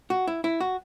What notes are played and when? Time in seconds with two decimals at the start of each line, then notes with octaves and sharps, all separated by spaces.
0.10 F#4
0.27 E4
0.44 E4
0.61 F#4